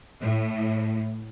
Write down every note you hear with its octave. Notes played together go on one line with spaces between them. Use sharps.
A2